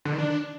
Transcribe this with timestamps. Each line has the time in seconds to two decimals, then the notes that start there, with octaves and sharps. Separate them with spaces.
0.05 D3
0.12 D#3
0.18 D4